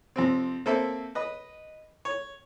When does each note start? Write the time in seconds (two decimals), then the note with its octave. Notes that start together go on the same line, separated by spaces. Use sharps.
0.16 F2 C3 C4
0.66 A#3 C4 A4 C5 E5
1.15 B4 D#5
2.05 C#5